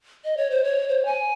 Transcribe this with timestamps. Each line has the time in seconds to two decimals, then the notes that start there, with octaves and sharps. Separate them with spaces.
0.25 D#5
0.37 C#5
0.50 C5
0.64 C#5
0.88 C5
1.05 G#5